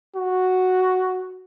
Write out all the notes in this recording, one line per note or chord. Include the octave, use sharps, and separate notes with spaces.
F#4